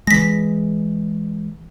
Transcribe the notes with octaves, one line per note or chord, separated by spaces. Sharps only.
E3 G#3 A#6 B6